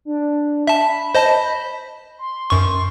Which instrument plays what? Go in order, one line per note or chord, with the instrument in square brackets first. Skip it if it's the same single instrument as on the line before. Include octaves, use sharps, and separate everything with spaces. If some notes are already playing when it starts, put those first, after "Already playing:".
[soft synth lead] D4
[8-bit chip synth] E5 A5 [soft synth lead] B5
[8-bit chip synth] C5 D#5 A5
[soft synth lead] C6
[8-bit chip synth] F#2 C#6